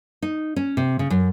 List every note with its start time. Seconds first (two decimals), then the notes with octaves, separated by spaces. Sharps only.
0.22 D#4
0.56 C#4
0.77 C3
0.99 C#3
1.10 F#2